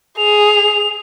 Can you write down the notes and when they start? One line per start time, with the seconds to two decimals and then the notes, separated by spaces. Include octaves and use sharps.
0.18 G#4 F7